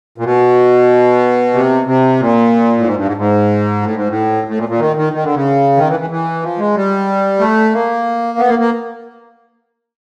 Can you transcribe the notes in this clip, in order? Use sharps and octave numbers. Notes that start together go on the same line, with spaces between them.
A#2
B2
C3
C3
A#2
A2
G#2
G2
G#2
G#2
A2
G#2
A2
A2
A#2
A#2
D#3
D#3
D#3
D3
C#3
D#3
E3
E3
E3
F3
G#3
G3
A3
A#3
B3
A#3
A#3